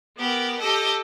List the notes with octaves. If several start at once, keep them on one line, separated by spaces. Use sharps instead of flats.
B3 G4 A#4
G4 A4 D#5